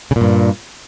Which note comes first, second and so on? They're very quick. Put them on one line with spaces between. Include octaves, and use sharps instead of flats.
C#3 A#2 G2